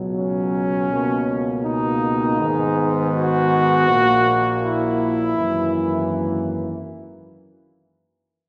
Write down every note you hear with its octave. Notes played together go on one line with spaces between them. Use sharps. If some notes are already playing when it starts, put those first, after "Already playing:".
Already playing: C#2 B2 F#3
C#4
C#2 B2 A#3
D#4
G#2 D#3 G#3 B3
F#4
A#1 A#2 A#3
E4
G#1 F#2 E3 A#3